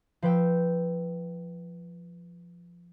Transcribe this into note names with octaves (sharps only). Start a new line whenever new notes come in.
F3 B4 G5 E6